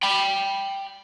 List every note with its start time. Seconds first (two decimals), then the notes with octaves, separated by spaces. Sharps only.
0.03 G5 B5